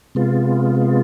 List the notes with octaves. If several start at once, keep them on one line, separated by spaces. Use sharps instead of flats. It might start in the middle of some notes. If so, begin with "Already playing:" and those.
C3 G#3 B3 F4